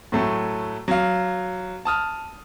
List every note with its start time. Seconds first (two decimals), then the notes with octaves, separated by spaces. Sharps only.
0.12 A2 F#3 A3
0.88 F#3 F5
1.85 A5 D#6 F6